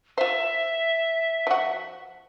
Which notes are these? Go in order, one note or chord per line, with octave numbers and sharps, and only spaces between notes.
F4 C5 E5
F3 F#4